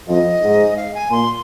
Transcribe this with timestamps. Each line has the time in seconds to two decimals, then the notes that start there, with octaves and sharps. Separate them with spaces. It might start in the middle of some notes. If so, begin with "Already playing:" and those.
0.08 F2 D#5
0.42 G#2
0.77 F5
0.95 G#5
1.11 A#2 C6